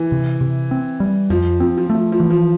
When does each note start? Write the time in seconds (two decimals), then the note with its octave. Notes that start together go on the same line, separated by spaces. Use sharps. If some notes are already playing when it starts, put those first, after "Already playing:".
Already playing: E3
0.12 C3
0.41 C3
0.71 C4
1.00 G3
1.30 F2 F3
1.60 F3 C4
1.78 F3
1.90 A3
1.95 F3
2.12 F3
2.20 E3
2.30 F3